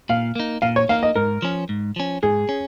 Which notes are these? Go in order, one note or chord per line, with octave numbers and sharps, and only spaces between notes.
A#2 F5
A#3 D#4
A#2 F5
C#5
A#3 D#4 F5
D#5
G#2 A#4
F3 C#4
G#2
F3 C#4
G#2 G#4
C#4